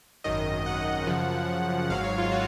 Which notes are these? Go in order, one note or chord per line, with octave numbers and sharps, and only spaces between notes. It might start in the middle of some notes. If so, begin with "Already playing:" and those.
G#1 F#2 D#3 D#5
F#5
F#2 C#3 F3
G#1 G#2 F#3 F5
C#5
F4
F#4